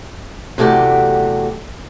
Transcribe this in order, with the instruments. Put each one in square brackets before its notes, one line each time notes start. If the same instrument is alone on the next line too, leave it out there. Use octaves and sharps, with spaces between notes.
[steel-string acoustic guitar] E2 C3 A3 F#4 G4 D5